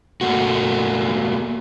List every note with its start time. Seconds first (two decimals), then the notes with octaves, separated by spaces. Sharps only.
0.21 A3 A#3 F#4